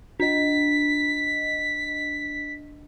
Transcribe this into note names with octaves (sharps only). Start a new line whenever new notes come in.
D4 D#5 B6